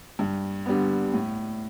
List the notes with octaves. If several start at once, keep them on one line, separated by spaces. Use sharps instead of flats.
G2
D3 G3 B3
A2